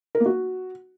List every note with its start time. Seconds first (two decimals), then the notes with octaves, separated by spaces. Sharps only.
0.15 A#4
0.20 A#3
0.26 F#4